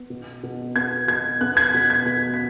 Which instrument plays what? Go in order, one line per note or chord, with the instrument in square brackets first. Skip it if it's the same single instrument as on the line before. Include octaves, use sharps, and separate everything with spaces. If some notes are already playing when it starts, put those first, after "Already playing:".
Already playing: [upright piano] B3
B2
B2
B3 G#6
B2 G#6
B3 F#6
G#6
B2 B6
G#6
B2 B6
B6